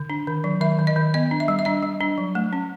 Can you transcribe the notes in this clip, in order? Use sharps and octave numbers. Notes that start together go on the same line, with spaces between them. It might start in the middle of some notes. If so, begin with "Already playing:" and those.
Already playing: D3
D4
D#3
F#3
D#3 E5
D#3
D#5
D#3
B3 D#5
D4
E5
G3
E5
D4 D#5
G3
D4
F#3
A3
C#4